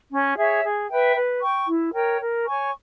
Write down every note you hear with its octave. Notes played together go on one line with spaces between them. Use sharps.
C#4
G#4 C#5 E5
G#4
B4 E5 G5
B4
G5 C#6
E4
A#4 C#5 G5
A#4
C#5 G#5 C#6